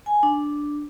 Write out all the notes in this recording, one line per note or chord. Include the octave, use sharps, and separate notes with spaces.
G#5
D4